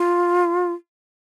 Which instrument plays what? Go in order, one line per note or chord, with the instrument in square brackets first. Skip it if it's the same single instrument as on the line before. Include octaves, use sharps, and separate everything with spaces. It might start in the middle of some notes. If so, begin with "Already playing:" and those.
Already playing: [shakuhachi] F4